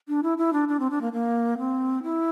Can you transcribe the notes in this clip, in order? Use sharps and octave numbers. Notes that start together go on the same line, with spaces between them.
D4
E4
E4
D4
D4
C4
D4
A#3
A#3
C4
E4